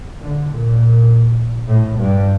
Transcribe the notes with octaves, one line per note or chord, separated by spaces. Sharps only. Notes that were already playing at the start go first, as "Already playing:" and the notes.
D3
A#2
A2
G2